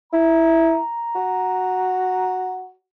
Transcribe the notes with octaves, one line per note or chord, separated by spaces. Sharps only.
E4 A#5
F#4